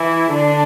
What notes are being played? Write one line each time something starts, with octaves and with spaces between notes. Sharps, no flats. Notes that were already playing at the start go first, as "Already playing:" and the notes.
Already playing: E3 E4
D3 D4